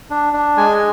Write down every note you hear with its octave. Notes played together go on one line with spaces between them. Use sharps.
D4
D4
G#3 G#5